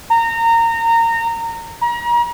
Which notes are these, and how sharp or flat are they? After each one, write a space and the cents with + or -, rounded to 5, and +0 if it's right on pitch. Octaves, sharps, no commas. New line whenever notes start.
A#5 -25
A#5 +35